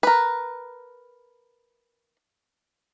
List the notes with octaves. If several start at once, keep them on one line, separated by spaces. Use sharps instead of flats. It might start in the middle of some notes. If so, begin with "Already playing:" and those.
A#4 B4